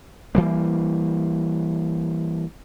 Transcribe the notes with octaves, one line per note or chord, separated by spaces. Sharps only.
E3 G3 A#3